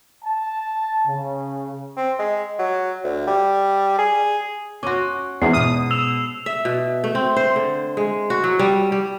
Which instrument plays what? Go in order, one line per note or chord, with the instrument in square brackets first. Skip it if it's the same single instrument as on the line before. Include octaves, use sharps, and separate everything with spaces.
[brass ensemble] A5
C#3
[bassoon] C4
G#3
F#3
D2
G3
G#4
[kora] C#4 F#4 [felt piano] C6 D6
[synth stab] E2 [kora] G#2 [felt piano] C#4 E4 [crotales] C7
[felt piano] B2 F6 [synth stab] D#6
[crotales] E6 E7 F7
[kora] E5
B2
A3
C4
C5
D3
G#3
F#4
F#3
G3
G3